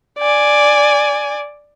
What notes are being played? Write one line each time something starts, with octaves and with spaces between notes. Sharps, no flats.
D5 G#5